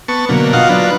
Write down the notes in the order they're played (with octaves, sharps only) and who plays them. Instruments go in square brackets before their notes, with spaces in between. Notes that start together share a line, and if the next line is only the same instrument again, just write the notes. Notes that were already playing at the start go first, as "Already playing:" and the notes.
[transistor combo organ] B3 A5 C#6
B2 D3 F#3 A#3
F4 F#4 D#5 F5 F#5
F#3 D4 F4 B4